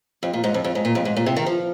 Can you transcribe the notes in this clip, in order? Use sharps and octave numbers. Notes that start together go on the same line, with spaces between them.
F2
A#2
G#2
F2
F2
G#2
A#2
F2
G#2
A#2
C3
D#3
F3